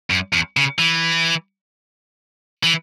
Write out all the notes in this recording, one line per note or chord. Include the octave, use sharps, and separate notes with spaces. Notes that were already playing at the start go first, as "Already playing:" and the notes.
F#2
E2
C#3
E3
E3